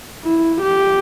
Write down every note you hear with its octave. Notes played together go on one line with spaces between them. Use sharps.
E4
G4